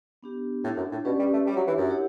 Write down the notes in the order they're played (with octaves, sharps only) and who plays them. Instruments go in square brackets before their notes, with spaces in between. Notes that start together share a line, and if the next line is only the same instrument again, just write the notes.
[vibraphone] B3 D4 G4
[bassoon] A2 [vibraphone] D4 A4 E5
[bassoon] F#2
A2
[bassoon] B2 [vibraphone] C#4 G4 B4 D5
[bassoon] G3
A3
[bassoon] G3 [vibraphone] D4 G4 C#5 E5
[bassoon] F#3
E3
F#2
[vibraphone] E4 G4 C#5 F#5